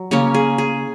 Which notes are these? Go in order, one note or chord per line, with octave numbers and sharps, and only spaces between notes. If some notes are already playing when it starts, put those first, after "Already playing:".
Already playing: F#3
C#3 A#3 C#4 C#5
G#4
G#4